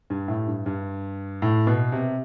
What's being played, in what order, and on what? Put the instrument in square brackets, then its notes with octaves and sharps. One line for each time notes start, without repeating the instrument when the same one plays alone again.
[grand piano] G2
A2
G2
G2
A2
B2
C3